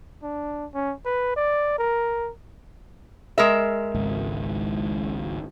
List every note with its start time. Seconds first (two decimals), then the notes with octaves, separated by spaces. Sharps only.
0.23 D4
0.75 C#4
1.05 B4
1.37 D5
1.79 A#4
3.38 G#3 A#4 E5
3.94 G#1 C#2 G#2